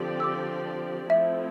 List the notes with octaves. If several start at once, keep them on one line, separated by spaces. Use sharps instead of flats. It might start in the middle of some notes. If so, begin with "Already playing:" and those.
Already playing: D3 F3 C4 G4 D5
E6
D6
F3 A3 C4 E4 E5